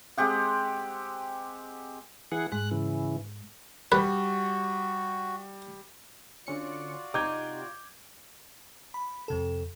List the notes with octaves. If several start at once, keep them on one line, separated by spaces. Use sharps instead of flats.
G#3 C4 G4 F#5
E3 G#4 F#5
G#2 G#3 F#6
C#3 E3
G3 F#4 B4
D3 C#4 F4 F#4 D5 C#7
C3 D#4 G4 D6 G6 G#6
B5
F2 C3 A4